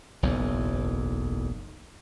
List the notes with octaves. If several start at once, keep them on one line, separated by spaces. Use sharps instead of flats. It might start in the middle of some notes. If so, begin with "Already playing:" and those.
F#1 B1 E2